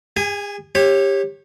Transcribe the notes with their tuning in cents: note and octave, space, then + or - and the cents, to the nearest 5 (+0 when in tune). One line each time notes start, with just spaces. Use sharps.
G#4 -40 G#5 +0
G4 +15 C#5 -20